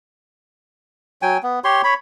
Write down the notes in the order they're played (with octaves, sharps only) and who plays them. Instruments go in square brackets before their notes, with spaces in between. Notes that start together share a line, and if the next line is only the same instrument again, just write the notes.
[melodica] F#3 G5 G#5
B3
G4 C#5 C6
C#5 B5